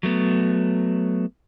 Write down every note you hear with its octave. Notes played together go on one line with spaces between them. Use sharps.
F#3 A3 B3